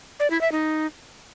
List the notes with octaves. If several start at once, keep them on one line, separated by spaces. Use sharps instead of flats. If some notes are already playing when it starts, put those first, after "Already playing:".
D5
E4
E5
D#4